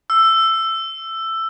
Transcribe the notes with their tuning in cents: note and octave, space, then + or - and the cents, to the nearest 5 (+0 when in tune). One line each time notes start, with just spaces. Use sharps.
E6 +10